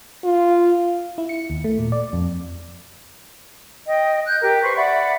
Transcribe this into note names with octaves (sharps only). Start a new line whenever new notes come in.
F4
E4
C#7
D#2
A3
A#2
D5
F2
D#5 G5
F#6 G6
G4 A#4
B4 C5 C#6
D5 E5 F#5 B5